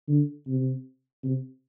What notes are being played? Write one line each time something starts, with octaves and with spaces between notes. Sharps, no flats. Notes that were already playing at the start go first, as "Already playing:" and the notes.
D3
C3
C3